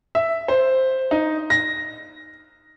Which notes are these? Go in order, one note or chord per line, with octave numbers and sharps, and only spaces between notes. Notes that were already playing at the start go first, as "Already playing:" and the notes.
E5
C5
D#4
A#6